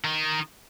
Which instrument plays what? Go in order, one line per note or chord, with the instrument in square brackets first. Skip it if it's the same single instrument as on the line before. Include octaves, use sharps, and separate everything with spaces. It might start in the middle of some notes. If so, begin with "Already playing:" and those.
[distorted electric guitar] D#3